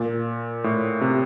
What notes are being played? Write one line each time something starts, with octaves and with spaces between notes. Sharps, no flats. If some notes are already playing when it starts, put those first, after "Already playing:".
Already playing: A#2
A2
C3